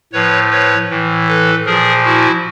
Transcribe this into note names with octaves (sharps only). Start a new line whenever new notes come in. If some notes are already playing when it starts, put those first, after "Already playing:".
A2 F3 B4 C#5
B4 C#5
A2 E3
A4 B4
A#2 F3 G#4 A#4
E4 F#4